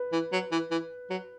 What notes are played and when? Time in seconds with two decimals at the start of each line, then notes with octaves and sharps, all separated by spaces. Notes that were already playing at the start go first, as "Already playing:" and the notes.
Already playing: B4
0.13 E3
0.33 F#3
0.52 E3
0.71 E3
1.11 F#3